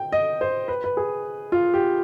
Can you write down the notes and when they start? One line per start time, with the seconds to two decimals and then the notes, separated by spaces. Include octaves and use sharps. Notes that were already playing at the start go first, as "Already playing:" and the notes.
Already playing: G5
0.12 D#5
0.41 C5
0.68 B4
0.84 B4
0.97 G#4
1.52 F4
1.74 G4